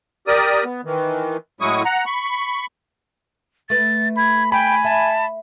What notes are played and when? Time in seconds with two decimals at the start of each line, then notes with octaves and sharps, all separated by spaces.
0.27 G4 A#4 D5 D#6
0.64 B3
0.85 D#3 E3
1.61 A2 F#3 G#3 E4 C#6 D#6
1.85 F#5 A#5
2.06 B5 C#6
3.70 A3 B4 A6
4.17 B5 G#6
4.52 G5 G#5 B5
4.84 E5 A5